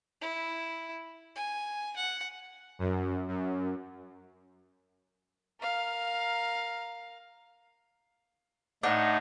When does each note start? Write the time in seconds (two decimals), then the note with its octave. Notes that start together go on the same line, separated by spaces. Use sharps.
0.21 E4
1.36 G#5
1.97 F#5
2.79 F#2
3.28 F#2
5.60 A#4 F5
8.83 A2 D4 D#4 F#5